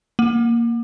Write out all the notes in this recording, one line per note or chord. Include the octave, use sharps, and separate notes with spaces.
A#3